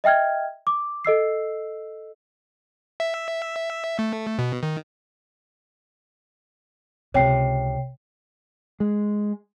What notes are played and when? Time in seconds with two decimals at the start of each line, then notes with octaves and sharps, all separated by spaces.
0.04 D#5 E5 G5 F6 G#6
0.67 D6
1.05 A4 D#5 E6 C7
3.00 E5
3.99 A3
4.39 B2
4.63 D#3
7.14 C#2 C3 C#5 G5 C7
8.80 G#3